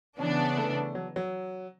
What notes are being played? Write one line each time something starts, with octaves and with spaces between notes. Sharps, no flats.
C#3 E3 B3 C#4 D4
A3
F#3
F#3